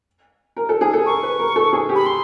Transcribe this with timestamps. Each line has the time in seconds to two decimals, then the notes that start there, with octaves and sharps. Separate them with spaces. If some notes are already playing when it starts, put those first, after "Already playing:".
0.57 A#4
0.69 A4
0.81 G#4
0.93 A4
1.06 A#4 C#6
1.23 B4
1.39 A#4
1.56 A4
1.73 G#4
1.89 G4
1.95 B5
2.06 C6